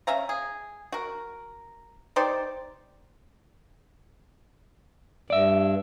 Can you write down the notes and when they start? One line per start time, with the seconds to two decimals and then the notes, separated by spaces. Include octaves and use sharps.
0.07 C#4 E5 F5 A#5
0.29 G#4
0.92 F#4 A#4
2.16 D#4 G4 C5 D5
5.30 G2 D5 E5